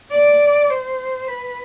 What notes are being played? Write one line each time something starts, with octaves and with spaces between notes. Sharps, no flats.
D5
C5
B4